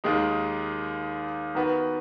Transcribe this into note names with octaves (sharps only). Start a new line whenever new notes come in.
D#2 D#3 G#3 D#4
D#3 B3 F#4 B4